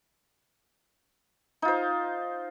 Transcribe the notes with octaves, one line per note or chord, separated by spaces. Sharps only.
D#4 F4 C5